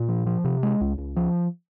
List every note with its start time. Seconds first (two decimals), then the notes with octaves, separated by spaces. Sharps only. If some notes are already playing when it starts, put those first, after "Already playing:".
Already playing: A#2
0.09 F3
0.26 F3
0.44 C3
0.63 G#3
0.81 C#2
0.98 C#2
1.16 F3